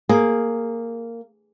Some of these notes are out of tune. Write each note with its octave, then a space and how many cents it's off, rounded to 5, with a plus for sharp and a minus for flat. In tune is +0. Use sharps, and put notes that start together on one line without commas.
A#3 -10 G#4 +0